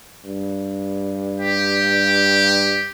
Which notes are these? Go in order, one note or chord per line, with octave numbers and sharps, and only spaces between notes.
G2
G4